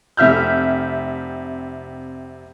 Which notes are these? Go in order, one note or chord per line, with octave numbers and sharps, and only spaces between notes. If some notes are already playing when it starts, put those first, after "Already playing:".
F1 C3 E5 F6 G6